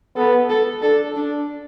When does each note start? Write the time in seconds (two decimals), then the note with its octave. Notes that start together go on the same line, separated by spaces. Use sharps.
0.16 B3 A4
0.50 A4
0.82 D4 A4
1.16 D4